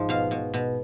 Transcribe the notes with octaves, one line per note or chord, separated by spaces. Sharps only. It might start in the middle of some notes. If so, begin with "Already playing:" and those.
Already playing: G#2 F3
B2 F5
B2
B2